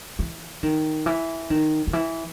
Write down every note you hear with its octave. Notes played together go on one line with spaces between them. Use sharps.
E3
D#3
E3
D#3
D#3
E3